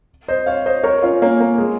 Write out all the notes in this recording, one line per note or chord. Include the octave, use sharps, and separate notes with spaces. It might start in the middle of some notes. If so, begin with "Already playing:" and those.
C5 D#5
C#5 F5
C5 D#5
A#4 C#5
C#4 F4
A#3 C#4
A#3
G#3